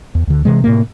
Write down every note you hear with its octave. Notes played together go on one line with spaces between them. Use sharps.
E2
D2 D3
C3 E3 G#3
A2 C3 A#3